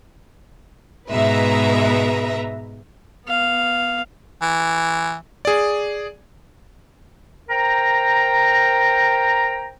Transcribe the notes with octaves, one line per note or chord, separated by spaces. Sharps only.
G#2 B2 G#3 B4 E5 A#5
B3 F5
E3
G#4 D5
A#4 C5 G5 A#5